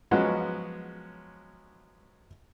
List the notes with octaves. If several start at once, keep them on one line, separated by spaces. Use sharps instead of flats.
F3 F#3 G#3 B3 C#4 F#4